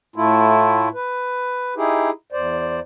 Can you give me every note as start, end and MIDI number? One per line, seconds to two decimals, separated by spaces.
0.16 0.89 45
0.16 0.89 57
0.16 0.89 64
0.16 0.89 65
0.94 1.74 71
1.76 2.10 63
1.76 2.10 64
1.76 2.10 67
1.76 2.10 68
2.32 2.80 40
2.32 2.80 72
2.32 2.80 74